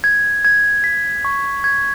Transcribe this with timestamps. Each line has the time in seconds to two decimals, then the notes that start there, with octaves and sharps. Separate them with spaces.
0.04 G#6
0.45 G#6
0.84 B6
1.25 C#6
1.64 G#6